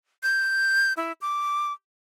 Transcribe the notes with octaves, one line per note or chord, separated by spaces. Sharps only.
G6
E4
D6